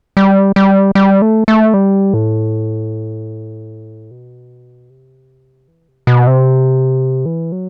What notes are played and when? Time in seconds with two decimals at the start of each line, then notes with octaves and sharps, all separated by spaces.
0.17 G3
0.56 G3
0.95 G3
1.22 A3
1.48 A3
1.74 G3
2.14 A2
4.11 B2
4.90 C3
5.68 E3
5.88 C3
6.07 B2
6.27 C3
7.26 E3
7.52 F#3